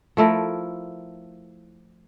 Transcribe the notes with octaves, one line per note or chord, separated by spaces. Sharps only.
F3 A3 E4 A#4